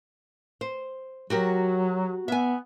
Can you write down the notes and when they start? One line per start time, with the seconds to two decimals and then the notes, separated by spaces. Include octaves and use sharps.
0.61 C5
1.30 F#3 F#4 G4 A#4
2.28 B3 E5 G#5